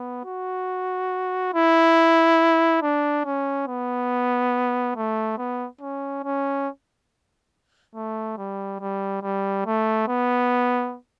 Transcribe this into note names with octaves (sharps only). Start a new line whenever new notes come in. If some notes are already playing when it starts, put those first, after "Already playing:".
Already playing: B3
F#4
E4
D4
C#4
B3
A3
B3
C#4
C#4
A3
G3
G3
G3
A3
B3